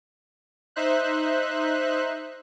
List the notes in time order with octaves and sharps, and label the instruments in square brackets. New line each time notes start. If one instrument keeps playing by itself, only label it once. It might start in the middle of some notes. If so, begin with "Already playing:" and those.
[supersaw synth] D#4 C5 E5 F#6